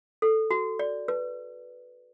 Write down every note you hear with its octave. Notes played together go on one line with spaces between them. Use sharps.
A4
F#4
D5
B4